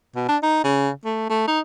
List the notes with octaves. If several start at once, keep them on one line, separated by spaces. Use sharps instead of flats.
B2
D4
D#4
C#3
A3
A3
D#4